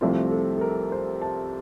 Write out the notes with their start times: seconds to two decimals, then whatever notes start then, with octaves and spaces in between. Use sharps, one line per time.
0.01 C2 C3 F3 A3 C4 F4
0.31 A4
0.57 A4
0.61 A#4
0.92 C5
1.22 A5